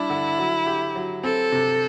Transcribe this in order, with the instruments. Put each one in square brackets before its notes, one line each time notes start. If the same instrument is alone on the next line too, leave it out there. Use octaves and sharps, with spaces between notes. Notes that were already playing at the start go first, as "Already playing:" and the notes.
Already playing: [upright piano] G3 D4 [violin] E4
[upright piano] D3
F#3
G4
F#3
[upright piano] C4 [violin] A4
[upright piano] C3